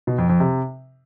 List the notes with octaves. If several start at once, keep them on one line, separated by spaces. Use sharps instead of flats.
B2
F2
F2
C3